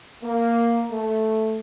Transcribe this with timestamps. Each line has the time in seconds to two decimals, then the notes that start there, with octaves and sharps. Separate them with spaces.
0.24 A#3
0.91 A3